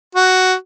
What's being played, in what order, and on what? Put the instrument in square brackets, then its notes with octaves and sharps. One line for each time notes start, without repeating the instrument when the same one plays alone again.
[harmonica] F#4